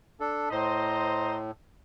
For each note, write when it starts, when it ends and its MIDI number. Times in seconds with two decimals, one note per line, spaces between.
0.20 0.49 62
0.20 0.49 69
0.51 1.51 45
0.51 1.37 72
0.51 1.37 75
0.51 1.37 82